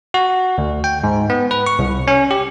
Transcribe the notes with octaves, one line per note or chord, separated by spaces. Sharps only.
F#4
D2
G5
G#2
B3
B4
C#6
C2
C#4
G4